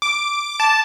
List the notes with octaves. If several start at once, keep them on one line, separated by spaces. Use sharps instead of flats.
D6
A5